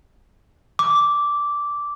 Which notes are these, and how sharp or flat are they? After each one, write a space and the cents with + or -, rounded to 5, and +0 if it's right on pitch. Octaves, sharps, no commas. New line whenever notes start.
D6 -10